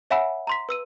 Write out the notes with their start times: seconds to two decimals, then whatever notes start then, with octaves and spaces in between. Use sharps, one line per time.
0.11 C#5 E5 F#5 G#5 B5 E6
0.47 A#5 C6 B6
0.69 B4 E6 D#7